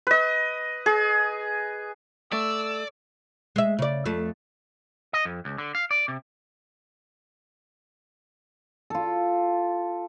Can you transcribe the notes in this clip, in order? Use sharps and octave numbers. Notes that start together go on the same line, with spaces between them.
B4 D#5
G#4
A3 D5 E6
G#3 E5
C#3 D5
F2 A3
D#5
F2
C#2
D3
F5
D5
C3
F4 A4